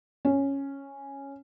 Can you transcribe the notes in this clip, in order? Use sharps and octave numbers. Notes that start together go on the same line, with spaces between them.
C#4